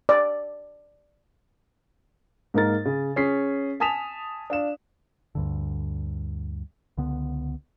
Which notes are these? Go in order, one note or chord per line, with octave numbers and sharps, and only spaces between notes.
D5
G#2 A#3 D#4 A#4 A6
C#3
C#4 G#4 B6 C7
G#5 A5 D#6 B6 E7 F7
D4 F5 E7
D2 G2 D3
C#2 D3 B3